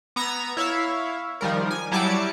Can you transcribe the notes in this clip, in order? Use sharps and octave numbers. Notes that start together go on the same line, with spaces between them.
B3 A#5 E6 G#6 A#6
E4 C#5 E5 F5
D#3 F3 G3 A#4
G#5
F#3 G3 E4 A5 D6 C#7